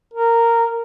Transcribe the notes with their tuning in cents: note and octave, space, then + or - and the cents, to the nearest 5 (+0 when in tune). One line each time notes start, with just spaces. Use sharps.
A#4 -10